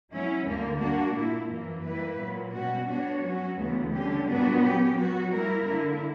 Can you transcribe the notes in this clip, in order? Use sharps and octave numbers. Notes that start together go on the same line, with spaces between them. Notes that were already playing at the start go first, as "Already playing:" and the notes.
F#3 C#4 E4
D2 D3 G3 A#3
G3 A#3 D4 F#4
A#2 A#3 E4
F#2 E3 A#3
G3 A#3 E4 B4
A#2 F#3 A#3
B2 G3 C#4 F#4
G3 B3 D4 F#4 C#5
F#3 C#4 F#4
D2 C#3 E3 B3
D3 G3 C#4 G4
A#2 G3 B3 D4 F#4
F#3 C#4 G4
F#3 B3 F#4
G3 A#3 E4 A#4
D3 A#3 E4